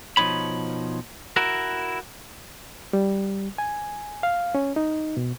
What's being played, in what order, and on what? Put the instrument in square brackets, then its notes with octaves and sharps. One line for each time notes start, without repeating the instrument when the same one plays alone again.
[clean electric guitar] B2 F3 D4 D#4 C#5 B5
E4 F#4 A#4
[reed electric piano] G3
G#5
F5
C#4
D#4
B2